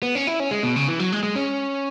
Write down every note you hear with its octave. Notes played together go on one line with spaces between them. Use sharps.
B3
C#4
E4
C#4
G#3
B2
C#3
E3
F#3
G#3
G#3
C#4